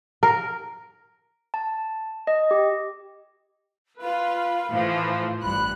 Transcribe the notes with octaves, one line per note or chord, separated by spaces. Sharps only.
A#4
A5
D#5
G4
F4 B4 F5
A2 E3 F3
A1 G2 B5 F#6